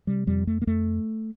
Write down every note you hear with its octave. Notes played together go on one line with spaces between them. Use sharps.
C3 G3
F2 G3
F2 A3
A#3
F2 A3